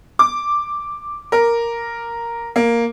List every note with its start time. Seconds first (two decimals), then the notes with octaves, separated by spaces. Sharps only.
0.19 D6
1.32 A#4
2.56 A#3